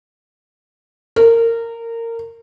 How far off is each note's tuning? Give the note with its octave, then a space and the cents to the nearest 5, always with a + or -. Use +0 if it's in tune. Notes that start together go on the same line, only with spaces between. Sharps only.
A#4 -20